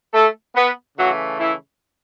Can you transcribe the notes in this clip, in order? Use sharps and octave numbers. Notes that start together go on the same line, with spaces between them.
A3 A4
B3 B4
C#3 E3 F#3 A3 F#4
E3 E4